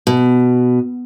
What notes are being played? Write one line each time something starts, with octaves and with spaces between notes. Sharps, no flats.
B2